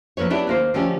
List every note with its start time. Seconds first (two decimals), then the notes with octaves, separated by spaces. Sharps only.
0.17 F3 A#3 A4 B4 C#5
0.30 B3 D4 E4 G4 C#5
0.47 D#2 A#3 C5
0.74 D3 F3 A3 C#4 G4